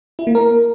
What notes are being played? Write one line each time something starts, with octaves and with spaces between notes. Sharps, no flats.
E4
A#3
A#4